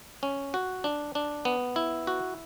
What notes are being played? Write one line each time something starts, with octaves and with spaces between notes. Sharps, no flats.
C#4
F#4
D4
D4
B3
E4
F#4